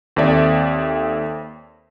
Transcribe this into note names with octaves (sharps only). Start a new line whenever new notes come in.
D#2 C4 A4 D5 E5